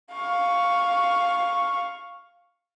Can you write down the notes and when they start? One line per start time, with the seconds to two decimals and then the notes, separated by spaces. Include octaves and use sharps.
0.15 F5 C#6